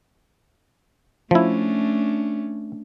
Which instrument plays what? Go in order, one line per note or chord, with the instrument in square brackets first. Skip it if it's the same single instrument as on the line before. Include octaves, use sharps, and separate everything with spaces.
[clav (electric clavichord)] F3 E4 [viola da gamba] A3 C#4 D4